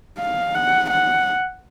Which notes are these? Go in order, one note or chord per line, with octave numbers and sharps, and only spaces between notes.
F5
F#5
F#5